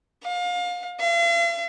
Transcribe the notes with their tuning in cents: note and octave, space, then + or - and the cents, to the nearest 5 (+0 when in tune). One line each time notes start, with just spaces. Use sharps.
F5 +30
F5 -45